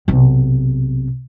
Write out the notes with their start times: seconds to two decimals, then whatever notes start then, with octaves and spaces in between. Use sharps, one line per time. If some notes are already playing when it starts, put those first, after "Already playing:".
0.08 B1 C3